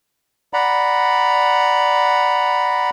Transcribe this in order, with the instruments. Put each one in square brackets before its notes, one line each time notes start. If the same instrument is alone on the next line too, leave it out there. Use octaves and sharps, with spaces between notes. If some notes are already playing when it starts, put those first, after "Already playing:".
[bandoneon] D5 F#5 A#5 B5